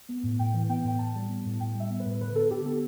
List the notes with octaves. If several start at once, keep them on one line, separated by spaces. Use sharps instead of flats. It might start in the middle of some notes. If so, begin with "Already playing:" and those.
B3
A2
A2 G5
E3
B3 G5
A2 G5
A2 A5
G3
B3
A2
A2 G5
G3
E5
B3
B4
A2
D3 B4
B3 A4
D3 G4
B3 A4